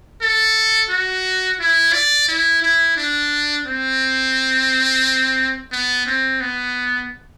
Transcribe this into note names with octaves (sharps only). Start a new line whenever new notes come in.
A4
F#4
E4
D5
E4
E4
D4
C4
B3
C4
B3